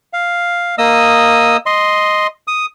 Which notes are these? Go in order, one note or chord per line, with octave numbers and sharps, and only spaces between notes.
F5
A#3 D#5 D#6 E6
D#5 C6
D#6